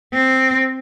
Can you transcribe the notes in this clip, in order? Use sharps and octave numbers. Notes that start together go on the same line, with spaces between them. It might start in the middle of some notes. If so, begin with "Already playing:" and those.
C4